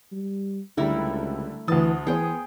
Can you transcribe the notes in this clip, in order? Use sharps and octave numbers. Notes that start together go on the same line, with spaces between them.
G3
C#2 D3 G3 A3 E4 A#4
D2 E3 A5 D#6
E3 B3 G#4 C5 G5